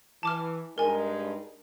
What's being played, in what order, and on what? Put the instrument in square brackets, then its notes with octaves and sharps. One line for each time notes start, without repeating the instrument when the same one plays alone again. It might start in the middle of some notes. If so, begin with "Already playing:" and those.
[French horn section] E3 [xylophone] A5 D6 F6
[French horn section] G2 G#3 D#4 [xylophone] A#4 G#5